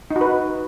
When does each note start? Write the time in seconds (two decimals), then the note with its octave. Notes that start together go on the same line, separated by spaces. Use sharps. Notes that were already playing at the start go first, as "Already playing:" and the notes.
0.11 D#4
0.16 F#4
0.21 B4